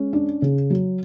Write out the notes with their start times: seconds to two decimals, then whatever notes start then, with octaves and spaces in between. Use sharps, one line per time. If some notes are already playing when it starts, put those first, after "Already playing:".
Already playing: G#3 C#4
0.13 D4
0.42 C#3
0.70 F#3